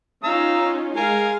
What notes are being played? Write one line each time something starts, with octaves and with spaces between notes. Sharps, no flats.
C#4 D#4 F4 F5 A#5 E6
G#3 A#4 F5 G#5